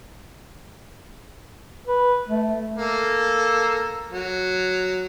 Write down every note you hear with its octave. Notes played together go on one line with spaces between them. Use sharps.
B4
A3
A#3 A4
F#3